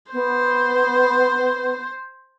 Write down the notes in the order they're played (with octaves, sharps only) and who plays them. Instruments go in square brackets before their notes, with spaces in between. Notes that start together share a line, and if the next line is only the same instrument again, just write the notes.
[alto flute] B3 [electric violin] C5